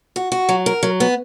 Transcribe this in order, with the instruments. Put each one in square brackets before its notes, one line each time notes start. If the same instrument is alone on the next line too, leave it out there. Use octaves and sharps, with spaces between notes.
[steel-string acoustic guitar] F#4
F#4
F#3
A#4
F#3
B3